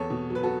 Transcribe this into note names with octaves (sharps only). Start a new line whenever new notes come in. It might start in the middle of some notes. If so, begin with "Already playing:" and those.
Already playing: E2 A4 C#5
B2
F#3
B4
F#4 A4